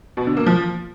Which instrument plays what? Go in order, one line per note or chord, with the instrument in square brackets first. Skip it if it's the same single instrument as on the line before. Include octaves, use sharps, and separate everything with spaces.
[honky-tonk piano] B2
D3
A#3
F3